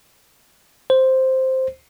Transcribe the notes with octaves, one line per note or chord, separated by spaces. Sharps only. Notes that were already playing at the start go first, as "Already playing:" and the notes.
C5